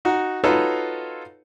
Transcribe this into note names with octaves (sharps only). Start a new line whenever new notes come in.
D#4 F#4 F#5
D#4 F4 F#4 A4 B4 C#5